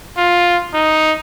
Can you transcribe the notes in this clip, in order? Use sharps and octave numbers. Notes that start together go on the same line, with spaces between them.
F4
D#4